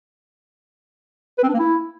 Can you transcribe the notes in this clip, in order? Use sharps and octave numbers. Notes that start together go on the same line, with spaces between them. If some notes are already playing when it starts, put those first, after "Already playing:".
B4
C4
D4
A#3
E4